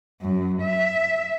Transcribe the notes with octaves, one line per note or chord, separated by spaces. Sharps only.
F#2
E5